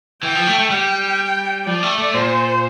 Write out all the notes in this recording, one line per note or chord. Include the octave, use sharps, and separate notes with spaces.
E3 G5
F3
A3
A3
G3 G5
F3 D5
A3
A3
A#2 C5